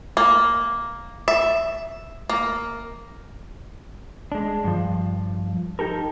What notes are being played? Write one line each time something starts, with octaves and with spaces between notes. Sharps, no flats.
A#3
E5
A#3
G#3 D4
G2 F3
D#4 G4 A4 A#4